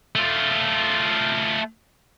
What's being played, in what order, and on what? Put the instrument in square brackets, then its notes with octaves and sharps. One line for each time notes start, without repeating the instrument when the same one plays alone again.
[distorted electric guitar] A3 F4